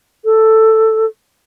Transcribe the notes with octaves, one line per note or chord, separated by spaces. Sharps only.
A4